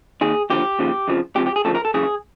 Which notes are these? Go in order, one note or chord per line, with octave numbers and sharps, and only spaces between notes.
D#2 D#3 G#4
D#2 D3 F3 G4
D#2 C#3 F3
F2 C#3 F3
C#2 C3 F3 G4
G4
G#4
D2 C#3 F3 A4
A#4
A4
F#2 C#3 E3 G#4